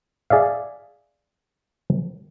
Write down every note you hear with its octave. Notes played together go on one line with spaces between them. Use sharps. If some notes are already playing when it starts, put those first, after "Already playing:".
G#4 D5 E5 F5